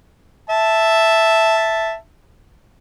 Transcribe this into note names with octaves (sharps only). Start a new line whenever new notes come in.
E5 A5